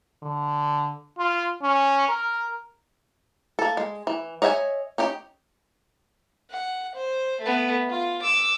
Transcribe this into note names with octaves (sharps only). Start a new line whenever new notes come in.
D3
F4
C#4
A#4
A#3 A4
G#3
E3
C#5 D#5 E5 G5 G#5
C#4 D#4 G4
F#5
C5
A3 B3
F4
D6 E6